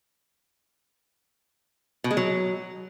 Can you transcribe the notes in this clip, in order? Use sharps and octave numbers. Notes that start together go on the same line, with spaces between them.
B2
G#3
F#3